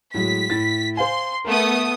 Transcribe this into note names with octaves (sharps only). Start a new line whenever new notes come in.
A2 F#3 G#3 B6
A2 E4 A6
C5 F5 G#5 C6
A3 B3 A#4 D#6